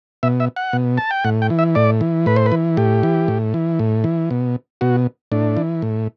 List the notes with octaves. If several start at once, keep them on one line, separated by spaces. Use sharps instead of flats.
B2 E5
E5
F#5
B2
A5
G5
A2 F#5
G5
E3
E5
A2 D5
E3
A2 B4
C5
B4
E3
A2 G4
E3
A2
E3
A2
E3
B2
B2 F#4
A2 D4
E3
A2